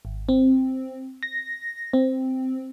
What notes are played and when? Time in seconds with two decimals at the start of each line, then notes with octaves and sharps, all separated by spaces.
0.05 G#1
0.29 C4
1.23 A#6
1.93 C4